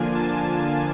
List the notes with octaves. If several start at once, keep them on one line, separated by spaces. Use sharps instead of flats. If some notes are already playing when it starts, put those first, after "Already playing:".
Already playing: D3 F3 A#3 D4 F4 G#5
A5